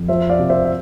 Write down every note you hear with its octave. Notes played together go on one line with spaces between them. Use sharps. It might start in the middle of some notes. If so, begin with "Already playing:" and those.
Already playing: F2
F3 C5 E5
D5 F5
C3
C5 E5
E5